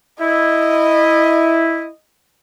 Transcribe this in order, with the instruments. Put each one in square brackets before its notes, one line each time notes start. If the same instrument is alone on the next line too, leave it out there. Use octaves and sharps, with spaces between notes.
[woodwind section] E4 [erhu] D#5